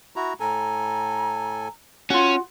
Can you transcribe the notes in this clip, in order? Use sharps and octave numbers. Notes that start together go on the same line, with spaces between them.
E4 F#4 A#5
A2 A4 G#5 A#5
C#4 F4 F#4